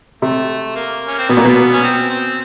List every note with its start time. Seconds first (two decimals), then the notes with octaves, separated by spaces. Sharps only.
0.22 C3 A3
0.76 A#3
1.08 C#4
1.19 C4
1.29 B2 B3
1.37 A#2
1.45 B2
1.72 C#4
1.83 C4
2.10 C4